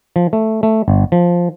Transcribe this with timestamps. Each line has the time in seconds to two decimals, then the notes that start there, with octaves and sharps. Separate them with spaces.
0.16 F3
0.33 A3
0.63 A3
0.88 G1
1.12 F3